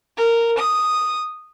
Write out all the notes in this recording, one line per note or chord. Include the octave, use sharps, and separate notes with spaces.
A#4
D#6